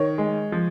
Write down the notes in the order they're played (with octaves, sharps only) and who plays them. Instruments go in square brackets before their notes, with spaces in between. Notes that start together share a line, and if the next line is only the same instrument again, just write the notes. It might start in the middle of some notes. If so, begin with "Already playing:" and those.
Already playing: [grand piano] D#3 [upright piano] C#5
[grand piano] G#3
F3